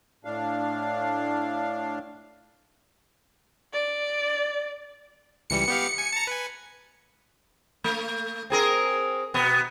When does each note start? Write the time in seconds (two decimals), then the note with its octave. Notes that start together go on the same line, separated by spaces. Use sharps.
0.25 A2 D4 F5
3.73 D5
5.50 C#2 E3 G3 C#7
5.68 B3 G4 F5
5.98 G#5
6.13 A5 A#5
6.27 B4 G#5
7.84 A3
8.50 C4 G#4 A#4
9.34 B2 B3